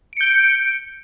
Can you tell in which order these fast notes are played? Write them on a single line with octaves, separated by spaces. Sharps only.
D7 C#7 G6